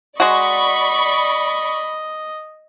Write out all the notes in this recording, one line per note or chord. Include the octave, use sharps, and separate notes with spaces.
G#3 F#4 D5 D#5 B5 C#6